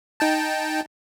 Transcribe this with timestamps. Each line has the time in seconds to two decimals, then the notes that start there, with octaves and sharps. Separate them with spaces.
0.20 D#4 G5 A5